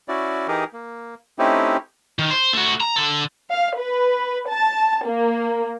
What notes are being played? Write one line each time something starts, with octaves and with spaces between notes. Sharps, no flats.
C#4 E4 F#4 D5
E3 D#4 G4 G#4 A#4
A#3
A3 C4 C#4 D#4 E4 G4
D#3
C5
A3 F#4
A#5
D3 A4
F5
B4
A5
A#3